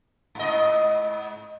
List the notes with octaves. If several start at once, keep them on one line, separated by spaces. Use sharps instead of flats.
G#2 D#5